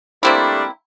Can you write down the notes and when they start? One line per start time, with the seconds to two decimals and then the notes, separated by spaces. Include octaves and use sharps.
0.23 G3 A3 A#3 C4 D4 E4